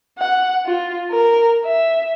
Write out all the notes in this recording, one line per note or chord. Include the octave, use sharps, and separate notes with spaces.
F#5
F4
A#4
E5